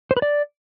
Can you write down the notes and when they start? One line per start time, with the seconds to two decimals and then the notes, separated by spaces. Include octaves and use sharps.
0.11 C5
0.17 B4
0.22 D5